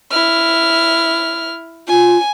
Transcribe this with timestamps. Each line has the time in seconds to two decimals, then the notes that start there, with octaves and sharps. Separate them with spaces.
0.12 E4 F6
1.88 F4 G#5